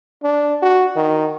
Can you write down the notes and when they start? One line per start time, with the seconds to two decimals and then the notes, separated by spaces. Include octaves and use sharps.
0.23 D4
0.62 F#4
0.96 D#3